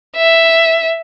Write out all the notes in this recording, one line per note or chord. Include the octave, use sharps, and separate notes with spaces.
E5